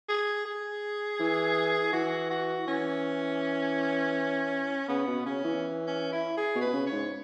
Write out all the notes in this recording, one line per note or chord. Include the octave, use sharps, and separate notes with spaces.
G#4
G#4
E3
E3 F#4
F#4
E3 C#4
C#3 B3
B2
C#3 C#4
E3
C#4
E4
G#4
B2
B4
B2
C#3
C#5
G#2